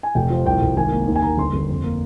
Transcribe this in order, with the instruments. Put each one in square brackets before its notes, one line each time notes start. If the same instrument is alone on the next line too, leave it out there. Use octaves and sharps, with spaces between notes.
[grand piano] G#5
F1 G5
F3
C2 G5
C2
G#1 G#5
A#3
D#2
G#5
D#2 A#5
G1 C6
G1
F2
A#3